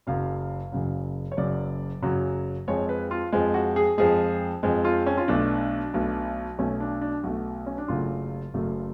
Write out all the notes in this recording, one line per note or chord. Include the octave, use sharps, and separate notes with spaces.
F#1 F#2 C#3 F#3 F5
F#1 F#2 C#3 F#3
C#5
F#1 F#2 C#3 F#3 D5
F#1 F#2 C#3 F#3
F2 F3 G#3 C#5
B4
F4
F2 F3 G#3
F#4
G#4
F2 F3 G#3 G#4
F2 F3 G#3
F4
C#4
F4
B1 B2 A3 D4
B1 B2 A3
B1 B2 A3 C#4
D4
D4
B1 B2 A3 F#4
C#4
D4
F#1 F#2 C#3 F#3 A3 F4
F#1 F#2 C#3 F#3 A3